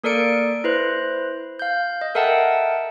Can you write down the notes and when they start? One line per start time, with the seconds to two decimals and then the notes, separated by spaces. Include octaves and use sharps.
0.04 A#3 A4 A#4 D5 C#7 D7
0.64 E4 B4 C5
1.59 F5 G6
2.01 D#5
2.15 A4 A#4 E5 F#5 G5 A5